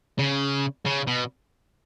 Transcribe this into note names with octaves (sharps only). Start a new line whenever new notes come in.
C#3
C#3
B2